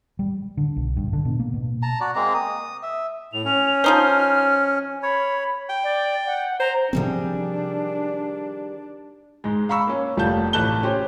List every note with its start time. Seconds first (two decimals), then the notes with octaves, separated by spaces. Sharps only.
0.19 G3
0.57 D3
0.76 B1
0.97 G2
1.13 D3
1.25 B2
1.40 A#3
1.54 B2
1.83 A5 A#5
2.00 F#4 D5
2.15 G#3 A#3 C4 A#5
2.34 D#6
2.83 E5
3.33 A2 F7
3.45 C#4
3.84 F3 D#4 C5 F6
5.03 C#5 B5
5.69 G5
5.84 D5
6.27 F#5
6.60 C5 A#5
6.93 C3 D#3 F3 G3 C4 D4 G#4
9.44 G#2 G#3
9.69 F5 A#5 B5 C#6 E6
9.87 A#3 C#4
10.17 F1 G3 A3 F4 A5 G6
10.53 A1 A3 A5 F#6 G7
10.83 C#4 G4 C5